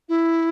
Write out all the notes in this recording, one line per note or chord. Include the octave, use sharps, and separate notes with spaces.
E4